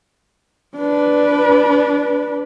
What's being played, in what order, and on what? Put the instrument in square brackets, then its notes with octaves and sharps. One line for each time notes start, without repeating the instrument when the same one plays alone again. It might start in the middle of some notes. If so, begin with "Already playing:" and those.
[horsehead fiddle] D4 B4